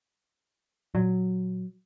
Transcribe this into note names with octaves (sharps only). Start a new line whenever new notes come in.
A#2 F#3